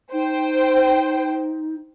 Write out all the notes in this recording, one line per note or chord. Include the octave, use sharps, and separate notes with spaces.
D#4 C5 G5